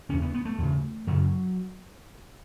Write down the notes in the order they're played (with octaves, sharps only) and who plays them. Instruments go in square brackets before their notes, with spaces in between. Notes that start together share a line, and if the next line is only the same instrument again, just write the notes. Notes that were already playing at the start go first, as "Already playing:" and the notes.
[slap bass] E2 C#3 C#4
B3
B3
A3
E2 C#3
F#2 C#3 F#3